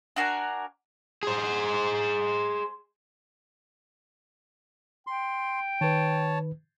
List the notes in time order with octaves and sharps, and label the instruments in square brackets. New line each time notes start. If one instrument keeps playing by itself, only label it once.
[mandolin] D4 F#4 A#4 G#5
[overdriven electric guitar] G#4 C5
[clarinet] G5 [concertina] C6
[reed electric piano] D#3 B4 [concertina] C#5 A5